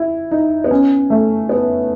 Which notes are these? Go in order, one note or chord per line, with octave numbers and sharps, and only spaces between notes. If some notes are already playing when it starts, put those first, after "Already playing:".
Already playing: E4
D#4
B3
C#4
A3
B3